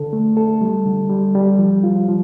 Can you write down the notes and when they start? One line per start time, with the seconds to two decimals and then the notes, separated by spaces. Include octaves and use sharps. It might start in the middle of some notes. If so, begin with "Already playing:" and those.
Already playing: D3 A4
0.13 A3
0.37 A4
0.61 G3
0.86 D3
1.10 G3
1.35 G3
1.58 F3
1.84 F4
2.08 F3